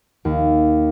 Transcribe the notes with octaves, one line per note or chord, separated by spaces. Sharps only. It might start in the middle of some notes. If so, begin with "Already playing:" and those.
D#2